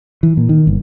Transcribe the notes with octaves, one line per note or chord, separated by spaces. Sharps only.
E3
A#2
D#3
G1